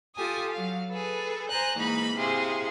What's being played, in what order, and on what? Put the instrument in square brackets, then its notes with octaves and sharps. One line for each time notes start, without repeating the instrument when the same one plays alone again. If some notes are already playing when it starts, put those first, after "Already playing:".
[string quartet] F4 G4 A4 G#5 D#6
F#3 F5
G#4 A4 B4
C5 G#5 A#5 F#6 G6
G#2 E3 A#3 D#4 B5
C3 E4 G#4 F5 C6